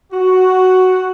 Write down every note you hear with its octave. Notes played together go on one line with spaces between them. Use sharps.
F#4